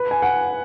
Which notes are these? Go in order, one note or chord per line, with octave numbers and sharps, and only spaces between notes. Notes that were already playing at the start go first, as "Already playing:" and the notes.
Already playing: B4
G#5
F#5